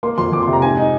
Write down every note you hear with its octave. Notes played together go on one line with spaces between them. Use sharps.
A#3 C6
F2 C6
F2 D6
C6
C3
A#5
G#2 G#5
D#4